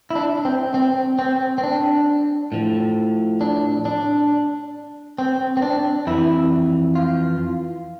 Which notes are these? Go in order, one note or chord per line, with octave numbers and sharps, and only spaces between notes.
E4
D4
C4
C4
C4
C4
D4
A2 F3
D4
D4
C4
C4
D4
F2 E3 E4
F4